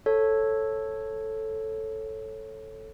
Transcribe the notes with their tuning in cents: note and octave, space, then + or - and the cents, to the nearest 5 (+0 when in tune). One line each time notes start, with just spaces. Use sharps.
A4 +0 C#5 -15